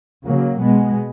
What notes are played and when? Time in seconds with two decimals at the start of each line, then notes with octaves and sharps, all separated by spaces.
0.24 C#3 F#3 A#3
0.59 B2 G#3 B3